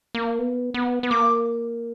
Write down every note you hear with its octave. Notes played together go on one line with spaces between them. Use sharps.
A#3
B3
B3
B3
A#3 D6